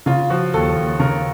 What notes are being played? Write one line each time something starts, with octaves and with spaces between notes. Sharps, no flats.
C#3 F4
F3 F#4
D#2 A4
D#2
C#3 A#4